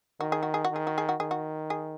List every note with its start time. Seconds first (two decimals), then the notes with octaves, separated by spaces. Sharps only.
0.20 D#3 F#4
0.32 G#4
0.43 F#4
0.54 G#4
0.65 F#4
0.71 D#3 G#4
0.87 F#4
0.98 G#4
1.09 F#4
1.20 D#3 G#4
1.31 F#4
1.70 G#4